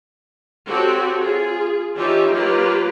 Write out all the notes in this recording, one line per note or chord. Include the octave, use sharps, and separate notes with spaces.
C4 F#4 G4 A4 C#5
F4 G#4
E3 C#4 D#4 F4 G4 E5
F#3 A#3 F4 G4 B4